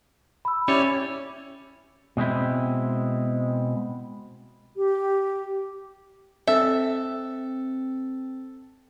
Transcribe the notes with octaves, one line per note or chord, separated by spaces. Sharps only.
B5 E6
C#4 E4 G4 C#5 D5
B2 G#3 C4 E4
G4
C4 A4 E5